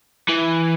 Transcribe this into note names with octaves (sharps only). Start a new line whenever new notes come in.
E3